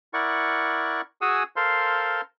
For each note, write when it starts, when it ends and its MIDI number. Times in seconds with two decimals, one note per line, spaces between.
0.14 1.01 64
0.14 1.01 70
0.14 1.01 74
0.14 1.01 78
0.14 1.01 85
1.21 1.43 66
1.21 1.43 68
1.21 1.43 78
1.21 1.43 80
1.21 1.43 87
1.21 1.43 88
1.56 2.21 69
1.56 2.21 70
1.56 2.21 72
1.56 2.21 77
1.56 2.21 84